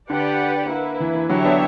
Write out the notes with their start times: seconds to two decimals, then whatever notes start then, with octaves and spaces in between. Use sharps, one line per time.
0.10 D3 G4 B4 D5 F#5
0.69 A#3 E4 B4
1.00 E3
1.15 E3
1.29 D3 F#3 E4 G4 C#5 E5
1.45 B3 D4